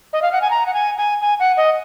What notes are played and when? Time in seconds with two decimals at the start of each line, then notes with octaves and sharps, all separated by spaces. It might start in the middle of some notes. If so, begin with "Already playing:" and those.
0.13 D#5
0.22 F5
0.32 F#5
0.42 G#5
0.51 A#5
0.66 F#5
0.74 G#5
0.98 G#5
1.22 G#5
1.40 F#5
1.57 D#5